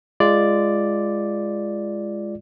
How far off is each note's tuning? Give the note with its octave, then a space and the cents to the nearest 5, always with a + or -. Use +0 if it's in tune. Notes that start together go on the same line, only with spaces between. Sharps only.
G#3 +0 F4 -20 D5 +0